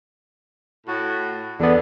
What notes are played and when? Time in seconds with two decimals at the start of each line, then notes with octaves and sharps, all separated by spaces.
0.87 A2 F#4
1.60 E2 D3 B3